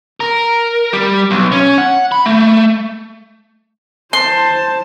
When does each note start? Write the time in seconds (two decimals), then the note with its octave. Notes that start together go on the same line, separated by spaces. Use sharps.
0.20 A#4
0.93 G3
1.31 B1
1.52 C#4
1.78 F#5
2.12 B5
2.26 A3
4.13 C5 A5 C6